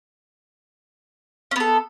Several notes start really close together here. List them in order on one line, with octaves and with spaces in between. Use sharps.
C#4 B3 A4